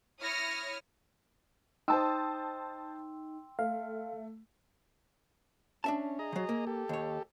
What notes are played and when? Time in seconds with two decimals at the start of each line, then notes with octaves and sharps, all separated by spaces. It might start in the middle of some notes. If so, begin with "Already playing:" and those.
0.20 E4 C#5 D#6 F6 A#6 C#7
1.88 D#4 C5 G5 A5 C6 D#6 E6
3.59 A3 F5
5.84 C#4 D4 E5 A5
6.19 G#4 D#5 A#5
6.32 D#3 F#3
6.49 A#3
6.67 G4 A4
6.89 D#2 C#5